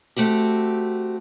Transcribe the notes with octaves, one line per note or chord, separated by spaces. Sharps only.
A3 C4 F#4 G4